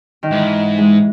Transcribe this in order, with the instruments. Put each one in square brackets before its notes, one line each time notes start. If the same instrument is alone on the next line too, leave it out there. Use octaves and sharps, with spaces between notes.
[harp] D#3
[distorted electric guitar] G#2 [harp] E3
[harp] G#3